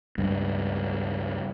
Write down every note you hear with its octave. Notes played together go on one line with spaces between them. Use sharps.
C#2 G2